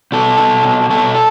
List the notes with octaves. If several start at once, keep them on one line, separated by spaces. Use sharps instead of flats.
B2 A4
B2
B2
B2 A4